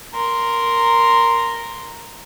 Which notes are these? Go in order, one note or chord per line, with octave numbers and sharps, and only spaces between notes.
A#4 C6